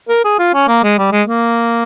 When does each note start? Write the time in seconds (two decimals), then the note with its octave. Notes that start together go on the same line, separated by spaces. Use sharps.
0.09 A#4
0.25 G#4
0.39 F4
0.54 C#4
0.68 A#3
0.84 G#3
0.98 G3
1.12 G#3
1.28 A#3